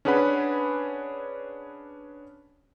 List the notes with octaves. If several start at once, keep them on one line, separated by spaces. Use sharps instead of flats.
C#4 D4 G#4 B4 F#5 B5